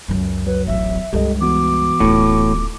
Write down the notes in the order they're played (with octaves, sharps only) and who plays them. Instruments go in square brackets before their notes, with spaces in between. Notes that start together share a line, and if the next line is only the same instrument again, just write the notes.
[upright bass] C#2 F#2
[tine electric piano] F#3 [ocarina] B4
[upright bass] D1 A1 [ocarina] E5
[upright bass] C#2 G2 [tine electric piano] G4 A4 D#5
[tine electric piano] E3 B3 F#4 [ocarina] D6
[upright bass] D1 F4 [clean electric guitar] A2